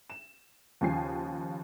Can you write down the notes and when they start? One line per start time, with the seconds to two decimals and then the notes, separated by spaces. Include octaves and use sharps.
0.10 E7
0.81 D#2 C#3 F3 G#5 C7